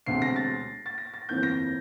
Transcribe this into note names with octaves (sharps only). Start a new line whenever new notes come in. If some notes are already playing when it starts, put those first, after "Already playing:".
E1 D2 C3 C7
A#6
A6
A6
A#6
A6
G1 F2 E3 A#3 G6
A#6